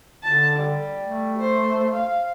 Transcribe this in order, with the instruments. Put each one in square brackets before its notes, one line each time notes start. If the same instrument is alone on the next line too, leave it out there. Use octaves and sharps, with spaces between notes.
[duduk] D3 [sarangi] A5
[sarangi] G3
[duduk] A3
[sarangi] C5
F5